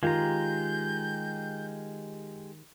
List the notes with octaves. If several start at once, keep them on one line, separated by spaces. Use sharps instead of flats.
D#3 G#3 F4 G4 A#5 G6